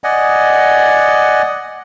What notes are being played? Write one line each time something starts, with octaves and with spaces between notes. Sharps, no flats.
D5 D#5 F#5 G#5